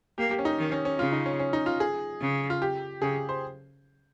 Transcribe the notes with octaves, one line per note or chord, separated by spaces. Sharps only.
A#3 G4
G4
C#4
D#4
D#3
C#4
C#4
C#3 F4
D#4
C#4
C#4
D#4
F4
G#4
C#3
F4
G4
C#3 G#4
C5